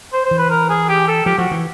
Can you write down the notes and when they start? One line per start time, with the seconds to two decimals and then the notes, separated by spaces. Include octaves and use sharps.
0.13 C5
0.25 C5
0.31 E3
0.38 B4
0.50 A#4
0.69 G#4
0.89 G4
1.08 A4
1.26 F3 G4
1.38 F3 F#4
1.51 E3